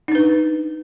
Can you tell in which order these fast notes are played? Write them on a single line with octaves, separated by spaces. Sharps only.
D#4 D4 B4